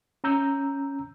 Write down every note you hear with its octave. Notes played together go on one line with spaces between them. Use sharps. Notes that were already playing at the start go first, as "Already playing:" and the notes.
C#4 A#5 E6 G6